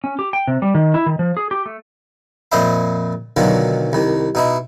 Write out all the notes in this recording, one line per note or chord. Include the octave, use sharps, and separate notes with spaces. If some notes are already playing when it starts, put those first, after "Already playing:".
C#4
G4
G5
C3
G3
D#3
E4
D#3
F3
G#4
G4
A3
F2 A#2 C5 D#5 E5 B5
B1 B2 D3 D#3 F#3 F4
C2 D#3
B2 D#4 E4